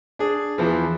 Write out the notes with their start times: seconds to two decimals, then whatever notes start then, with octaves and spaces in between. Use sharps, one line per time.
0.19 D4 G#4
0.58 E2 E3 F3